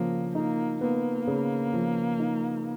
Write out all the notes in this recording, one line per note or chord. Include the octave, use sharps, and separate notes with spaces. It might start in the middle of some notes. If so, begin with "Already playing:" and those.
Already playing: C#3 F3 A#3
A#3 D#4
A#3 B3
C#3
F3
D#4